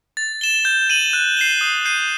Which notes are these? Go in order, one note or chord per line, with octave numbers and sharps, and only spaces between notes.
A6
E7 G7
G6
D#7 F#7
F#6
C7 E7 G7
D#6
G6 C7 D#7